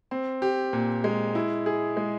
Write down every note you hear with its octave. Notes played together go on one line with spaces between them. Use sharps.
C4
G4
A#2
G#3
E4
G#4
G#3